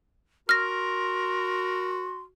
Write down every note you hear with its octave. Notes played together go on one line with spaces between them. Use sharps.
F#4 A#4 C6 F6 A#6